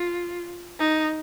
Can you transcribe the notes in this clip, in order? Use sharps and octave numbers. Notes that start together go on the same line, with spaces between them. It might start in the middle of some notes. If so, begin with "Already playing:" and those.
Already playing: F4
D#4